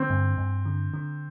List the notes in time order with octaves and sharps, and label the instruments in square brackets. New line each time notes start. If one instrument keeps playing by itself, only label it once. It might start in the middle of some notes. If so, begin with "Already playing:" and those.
Already playing: [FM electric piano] D3 [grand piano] C4
[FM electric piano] G2
G2
D3
D3